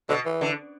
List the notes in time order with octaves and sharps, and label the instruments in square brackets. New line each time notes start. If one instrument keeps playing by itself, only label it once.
[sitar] B2 [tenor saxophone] D3
[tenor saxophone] E3
[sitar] D3